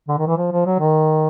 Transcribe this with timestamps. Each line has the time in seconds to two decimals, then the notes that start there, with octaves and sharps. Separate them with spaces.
0.09 D3
0.18 D#3
0.27 E3
0.38 F3
0.52 F3
0.66 F#3
0.79 D#3